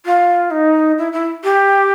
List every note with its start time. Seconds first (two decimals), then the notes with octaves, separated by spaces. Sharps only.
0.05 F4
0.51 D#4
0.98 E4
1.12 E4
1.44 G4